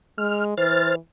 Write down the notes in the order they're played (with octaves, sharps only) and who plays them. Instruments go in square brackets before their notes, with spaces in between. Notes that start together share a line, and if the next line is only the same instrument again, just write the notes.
[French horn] G#3 [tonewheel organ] F6
[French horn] E3 [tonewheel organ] C5 F6 A6